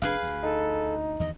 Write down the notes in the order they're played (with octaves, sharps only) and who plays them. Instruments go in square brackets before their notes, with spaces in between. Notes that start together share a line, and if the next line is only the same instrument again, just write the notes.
[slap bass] F1 A#2 D4 [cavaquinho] G#4 B4 F5
[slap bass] D2
[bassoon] D#4 [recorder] A4
[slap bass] E2 G2 D#3 [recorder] D#5